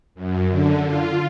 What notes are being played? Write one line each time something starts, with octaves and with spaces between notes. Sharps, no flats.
F#2
D3
F4